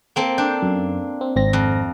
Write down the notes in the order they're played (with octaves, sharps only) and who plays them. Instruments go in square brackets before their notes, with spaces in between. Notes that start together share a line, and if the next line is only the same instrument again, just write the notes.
[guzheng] A#3 C4 A4
[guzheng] D4 [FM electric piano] G5
[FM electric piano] F#2
C4
G#1 C4 A#6
[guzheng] F2